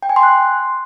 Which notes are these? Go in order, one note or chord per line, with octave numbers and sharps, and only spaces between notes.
G5
G#5
C6
F#6